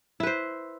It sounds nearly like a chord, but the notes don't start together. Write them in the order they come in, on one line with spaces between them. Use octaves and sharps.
E4 B4 C5